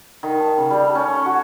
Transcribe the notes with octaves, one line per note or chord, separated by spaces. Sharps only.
D#3
A5
C#3
G3
A4
C#4
C#6
F#4